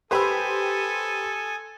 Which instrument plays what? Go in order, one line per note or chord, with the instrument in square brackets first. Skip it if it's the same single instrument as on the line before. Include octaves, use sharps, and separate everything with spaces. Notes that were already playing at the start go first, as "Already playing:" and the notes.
[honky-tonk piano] G4 C5 [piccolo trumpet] A4 [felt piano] B4 B5 E6 [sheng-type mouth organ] G#5 D#6